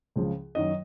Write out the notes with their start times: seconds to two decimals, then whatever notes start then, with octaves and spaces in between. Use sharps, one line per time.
0.16 C#2 C#3 F3
0.55 F#2 D#3 F#3 D#5